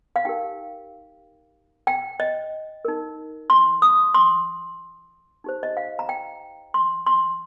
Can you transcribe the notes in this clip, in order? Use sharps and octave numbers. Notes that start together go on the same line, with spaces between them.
F5
D#4 G4 A#4 G5
G5
D#5
D#4 A#4
C6
D#6
C6
D#4 G4 C5
D#5
F5
A#5
G5
C6
C6